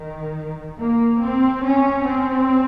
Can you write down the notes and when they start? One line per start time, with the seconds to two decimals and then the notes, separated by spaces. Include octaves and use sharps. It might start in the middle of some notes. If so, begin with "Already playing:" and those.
Already playing: D#3
0.79 A#3
1.22 C4
1.64 C#4
2.06 C4